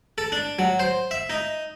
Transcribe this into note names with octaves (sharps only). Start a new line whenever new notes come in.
A4
D4
F#3
C5
E5
D#4